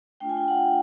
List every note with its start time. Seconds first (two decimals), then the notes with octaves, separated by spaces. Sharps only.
0.20 A3 D4 F4 G5
0.29 G#5
0.37 G5
0.48 F#5